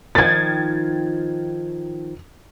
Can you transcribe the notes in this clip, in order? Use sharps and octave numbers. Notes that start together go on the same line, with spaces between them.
D#3 F3 G#6 A6